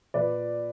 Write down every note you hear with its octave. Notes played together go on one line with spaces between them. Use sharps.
A#2 B4 D5